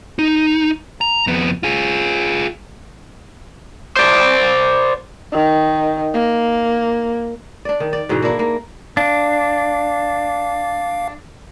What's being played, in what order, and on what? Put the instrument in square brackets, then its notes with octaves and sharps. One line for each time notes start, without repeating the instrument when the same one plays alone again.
[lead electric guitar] D#4
A#5
F2 B3
F4 G#4
[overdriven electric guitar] C5 D5
[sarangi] D#3
A#3
[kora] D4 D5
D#3
D5
G#2 B2 D3 E3
A#3 D4 E4
A#3
[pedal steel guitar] D4 [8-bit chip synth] F5